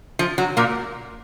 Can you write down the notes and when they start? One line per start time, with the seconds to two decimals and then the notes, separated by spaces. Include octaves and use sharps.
0.19 F3
0.38 F#3
0.57 A#2 A#3